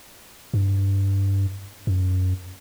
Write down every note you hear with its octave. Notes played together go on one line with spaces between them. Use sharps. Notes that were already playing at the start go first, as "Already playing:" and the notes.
G2
F#2